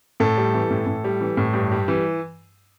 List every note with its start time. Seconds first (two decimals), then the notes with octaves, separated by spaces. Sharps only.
0.20 A2 A4
0.37 G3
0.54 E3
0.71 A2
0.87 A2
1.04 G3
1.21 E3
1.37 A2
1.54 G2
1.71 G3
1.88 E3